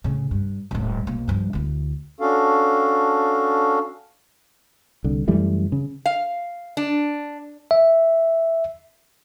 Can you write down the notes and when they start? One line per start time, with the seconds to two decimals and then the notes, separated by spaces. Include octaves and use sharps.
0.04 A2 C#3
0.31 G2
0.71 D#1 A2
1.07 B1 A#3
1.28 G2 F3
1.53 D2 E4
2.20 C#4 D4 F#4 A4 F5
5.04 C2 D3
5.28 F#2 E3 G3 A3
5.72 C#3
6.06 F5
6.77 D4
7.71 E5